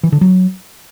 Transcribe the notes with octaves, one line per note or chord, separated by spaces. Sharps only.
E3
D3
F#3